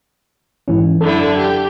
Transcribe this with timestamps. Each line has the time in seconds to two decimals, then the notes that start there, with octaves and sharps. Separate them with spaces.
0.68 G#2 E3 C#4
1.01 F#2 D3 E4 A4
1.37 G4